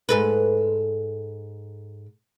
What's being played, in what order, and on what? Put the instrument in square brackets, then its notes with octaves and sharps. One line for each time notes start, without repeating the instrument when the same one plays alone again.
[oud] G#2 A4 B4